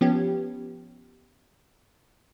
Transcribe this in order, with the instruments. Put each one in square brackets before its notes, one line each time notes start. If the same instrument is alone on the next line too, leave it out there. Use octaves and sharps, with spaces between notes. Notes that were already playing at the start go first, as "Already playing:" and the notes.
[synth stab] F3 B3 C#4 G4